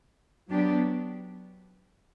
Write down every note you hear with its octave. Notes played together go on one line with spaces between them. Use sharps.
F#3 B3 D4 G4